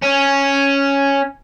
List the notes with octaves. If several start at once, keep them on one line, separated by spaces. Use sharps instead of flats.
C#4